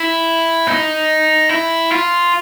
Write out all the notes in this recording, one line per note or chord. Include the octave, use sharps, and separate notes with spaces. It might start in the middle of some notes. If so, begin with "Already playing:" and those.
Already playing: E4
D#4
E4
F4